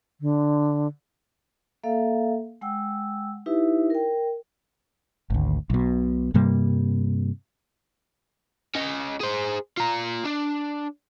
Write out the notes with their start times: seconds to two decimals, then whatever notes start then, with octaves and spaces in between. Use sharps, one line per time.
0.21 D3
1.84 A#3 A4 E5 F5
2.61 G#3 F#5 G5 E6
3.46 D#4 E4 G4 B4 E5
3.90 A#4 G5
5.30 G#1 D2
5.70 B1 B2
6.34 G2 C3 G3 A#3
8.75 C#4 D#5
9.20 G#4 C5
9.77 F4 A#5
10.25 D4